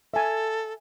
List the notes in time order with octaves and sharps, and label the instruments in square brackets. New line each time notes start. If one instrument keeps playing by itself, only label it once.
[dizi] A4 [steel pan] E5 G#5